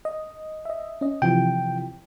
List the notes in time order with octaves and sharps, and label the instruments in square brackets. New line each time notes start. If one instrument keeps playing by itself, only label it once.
[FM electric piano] D#5
D#5 E5
C#4 D#5
[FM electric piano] C3 E3 F3 [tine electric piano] G5